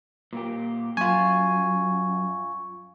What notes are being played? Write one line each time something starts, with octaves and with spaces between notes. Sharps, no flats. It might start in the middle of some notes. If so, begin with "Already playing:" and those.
A#2 A#3 G4
F#2 F4 G#5 C#6